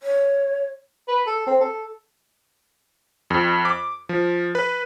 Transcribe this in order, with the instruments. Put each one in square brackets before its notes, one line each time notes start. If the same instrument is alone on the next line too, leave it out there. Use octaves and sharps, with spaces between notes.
[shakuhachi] C#5
[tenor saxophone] B4
A4
C4
A4
[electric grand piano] F2
D6
F3
B4